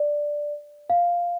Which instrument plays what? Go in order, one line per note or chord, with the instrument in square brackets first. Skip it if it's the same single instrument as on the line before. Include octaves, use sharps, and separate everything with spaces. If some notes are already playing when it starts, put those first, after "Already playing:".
Already playing: [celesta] D5
F5